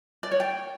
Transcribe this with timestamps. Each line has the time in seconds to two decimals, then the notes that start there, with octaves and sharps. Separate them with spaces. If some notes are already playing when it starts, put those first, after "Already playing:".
0.23 D5
0.31 C#5
0.40 G5